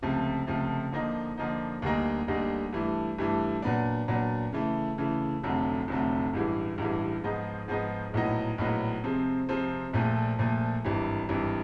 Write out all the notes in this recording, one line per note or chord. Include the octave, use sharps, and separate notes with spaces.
C#2 C3 F3 A3
C#2 C3 F3 A3
D3 F3 A#3 D#4
D3 F3 A#3 D#4
D2 D3 G3 A#3 D#4
D2 D3 G3 A#3 D#4
G2 E3 A3
G2 E3 A3
A#2 F#3 B3 D4
A#2 F#3 B3 D4
C#3 E3 A3
C#3 E3 A3
F1 F2 D3 F#3 A3
F1 F2 D3 F#3 A3
A1 G2 E3 G#3
A1 G2 E3 G#3
G#2 F3 G#3 B3 D#4
G#2 F3 G#3 B3 D#4
A#1 A2 F#3 B3 D#4
A#1 A2 F#3 B3 D#4
C3 F3 G#3 C4
C3 F3 G#3 C4
A#1 A#2 F3 A3
A#1 A#2 F3 A3
G#1 G2 E3
G#1 G2 E3